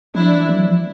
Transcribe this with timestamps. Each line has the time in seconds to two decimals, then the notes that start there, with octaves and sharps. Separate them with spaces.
0.15 F3 D4 E4
0.32 E3
0.49 F#3
0.65 F3